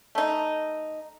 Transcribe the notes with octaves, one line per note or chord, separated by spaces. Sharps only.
A3 D#4